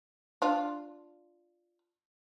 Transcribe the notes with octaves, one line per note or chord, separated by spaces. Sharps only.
D4 F4